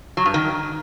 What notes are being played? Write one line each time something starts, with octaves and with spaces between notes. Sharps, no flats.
F#3
G2
D#3